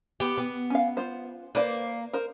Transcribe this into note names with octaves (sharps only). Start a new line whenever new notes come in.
B3 G4
B3
C#4 F5
F4 C5
A#3 B4 C5 D5
A#4 C5